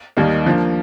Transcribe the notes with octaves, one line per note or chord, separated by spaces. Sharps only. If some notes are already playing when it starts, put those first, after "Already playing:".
D#2 D#3 G3 A#3 D#4
F3 A#3 D4